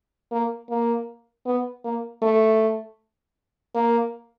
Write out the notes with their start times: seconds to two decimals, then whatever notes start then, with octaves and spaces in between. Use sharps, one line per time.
0.32 A#3
0.70 A#3
1.46 B3
1.84 A#3
2.22 A3
3.75 A#3